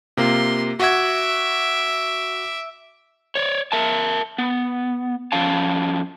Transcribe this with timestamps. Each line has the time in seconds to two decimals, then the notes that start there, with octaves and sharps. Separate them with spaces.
0.17 C3 A#3 F4 C6
0.80 F#4 E5 F#5 D6 G#6
3.35 C#5 D5
3.72 A#4 E5 A5
4.38 B3
5.32 F2 F3 C#4 F5 A5